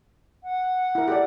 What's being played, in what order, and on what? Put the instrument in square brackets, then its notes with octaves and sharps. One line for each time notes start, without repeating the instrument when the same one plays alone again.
[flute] F#5
[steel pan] E4 A#4
G4 A4 D5